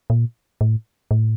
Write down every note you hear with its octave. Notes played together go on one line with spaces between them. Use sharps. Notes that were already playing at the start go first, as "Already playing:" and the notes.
A#2
A2
A2